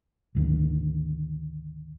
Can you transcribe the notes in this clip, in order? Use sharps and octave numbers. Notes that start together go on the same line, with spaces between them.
G#1 D2 D#3